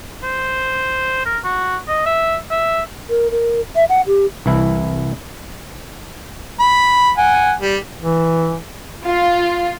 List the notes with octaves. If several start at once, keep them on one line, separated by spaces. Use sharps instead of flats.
C5
A#4
F#4
D#5
E5
E5
A#4
A#4
E5
F#5
G4
C2 E3 E4
B5
F#5 G#5
G3
E3
F4